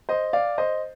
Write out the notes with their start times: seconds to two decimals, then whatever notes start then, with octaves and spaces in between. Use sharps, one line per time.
0.09 C5 D#5
0.33 D5 F5
0.58 C5 D#5